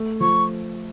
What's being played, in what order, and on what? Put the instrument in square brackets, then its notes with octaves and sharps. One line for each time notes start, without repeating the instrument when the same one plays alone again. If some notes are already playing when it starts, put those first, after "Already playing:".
Already playing: [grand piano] A3
[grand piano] F3 [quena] C#6